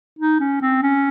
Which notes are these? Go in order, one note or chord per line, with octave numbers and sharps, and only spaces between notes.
D#4
C#4
C4
C#4